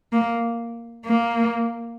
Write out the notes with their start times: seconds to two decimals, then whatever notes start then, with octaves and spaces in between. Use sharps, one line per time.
0.12 A#3
1.06 A#3